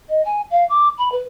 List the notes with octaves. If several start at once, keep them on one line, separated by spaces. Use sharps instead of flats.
D#5
G#5
F5
D6
B5
B4